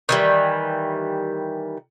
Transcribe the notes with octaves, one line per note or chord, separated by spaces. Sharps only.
D#3 E3 G3